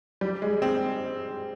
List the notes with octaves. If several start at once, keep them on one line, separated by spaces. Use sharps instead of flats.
G3
G#3
C4